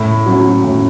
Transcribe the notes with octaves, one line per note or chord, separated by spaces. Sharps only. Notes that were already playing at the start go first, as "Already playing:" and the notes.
Already playing: A2
F#3 C#4 F#4
A2